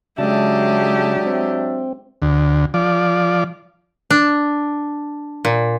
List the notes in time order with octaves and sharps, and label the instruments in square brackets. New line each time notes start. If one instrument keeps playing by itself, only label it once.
[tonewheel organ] C#3 A5 [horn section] F#3 D4 E5 [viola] G#3 G4
[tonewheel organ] C4
[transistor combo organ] D2
F3 D5
[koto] D4
A#2